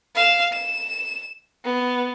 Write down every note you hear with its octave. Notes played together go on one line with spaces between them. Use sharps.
F5 E7
E7
B3